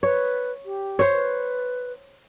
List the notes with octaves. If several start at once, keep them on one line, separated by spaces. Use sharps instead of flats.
B4 C#5
G4
C5 C#5
B4